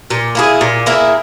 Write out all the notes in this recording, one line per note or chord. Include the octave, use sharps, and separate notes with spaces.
A#2
A#3 E4 G#4
A#2
A#3 E4 G#4